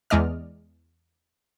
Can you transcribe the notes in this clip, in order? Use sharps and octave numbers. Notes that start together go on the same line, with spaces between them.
E2 G#3 D5 D#5 F6